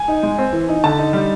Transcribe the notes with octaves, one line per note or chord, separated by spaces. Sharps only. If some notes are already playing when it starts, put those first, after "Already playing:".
Already playing: G#5
D#4
G#3
C4
E3
D#4
D3 A5
D#4
G3